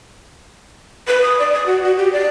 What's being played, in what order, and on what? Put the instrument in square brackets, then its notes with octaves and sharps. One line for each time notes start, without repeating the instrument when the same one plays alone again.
[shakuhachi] B4
D#6
D5
D#6
F#4
F#4
G4
D5